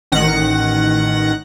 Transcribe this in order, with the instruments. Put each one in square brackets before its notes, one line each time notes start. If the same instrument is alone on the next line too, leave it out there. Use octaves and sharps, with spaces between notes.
[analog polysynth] A1 D#3 F#5 A#6